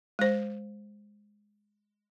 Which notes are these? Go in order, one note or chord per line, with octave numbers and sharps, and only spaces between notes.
G#3 C5